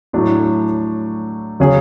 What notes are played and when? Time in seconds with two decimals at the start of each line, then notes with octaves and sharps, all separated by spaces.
0.13 A2 F#3 A3 D4
1.60 C#3 F#3 C#4 G#4